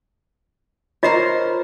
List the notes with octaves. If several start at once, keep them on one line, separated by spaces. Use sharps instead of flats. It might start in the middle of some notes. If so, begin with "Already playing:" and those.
F4 A#4 C5 C#5 D#5